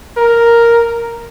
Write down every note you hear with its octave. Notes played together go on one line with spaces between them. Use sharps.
A#4